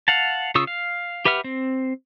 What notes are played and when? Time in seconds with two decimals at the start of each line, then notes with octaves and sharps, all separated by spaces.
0.08 F5 F#5 A5
0.55 C#3 F4 C#6 D#6 E6
0.67 F5
1.25 G4 B4 E5 F#5 F6
1.44 C4